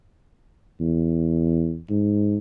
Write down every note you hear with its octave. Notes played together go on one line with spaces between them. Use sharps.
E2
G#2